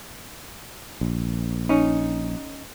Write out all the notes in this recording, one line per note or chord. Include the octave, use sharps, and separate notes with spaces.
A#1
C#4 D#4